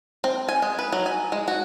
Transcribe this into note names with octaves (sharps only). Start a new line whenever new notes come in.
C4
G#5
G#3
B4
F#3
G#5
G#3
F#4